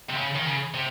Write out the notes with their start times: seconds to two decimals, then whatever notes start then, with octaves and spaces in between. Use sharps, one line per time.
0.09 C3
0.17 C#3
0.35 D#3
0.45 C#3
0.74 C3